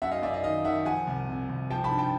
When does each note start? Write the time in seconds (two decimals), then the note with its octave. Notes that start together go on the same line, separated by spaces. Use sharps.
0.02 F#2 E5 F#5
0.11 D#5 F5
0.22 F#2 D5 E5
0.33 D#5 F5
0.44 D#3 D#5 F5
0.64 D#3 E5 F#5
0.85 F3 F#5 G#5
1.07 C2
1.28 C3
1.49 C2
1.70 F3 G5 A5
1.84 A5 B5
1.91 G2
1.98 G5 A5